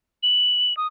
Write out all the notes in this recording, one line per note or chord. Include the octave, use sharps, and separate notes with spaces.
F#7
D#6